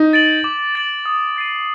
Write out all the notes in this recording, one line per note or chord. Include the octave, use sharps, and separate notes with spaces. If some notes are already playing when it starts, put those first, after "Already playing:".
Already playing: D#4
A6 D7 F#7
D6
A6 D7 F#7
D#6
A6 C7 D#7